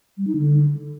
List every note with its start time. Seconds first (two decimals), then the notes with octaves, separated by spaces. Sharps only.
0.17 G3
0.27 D#4
0.37 D3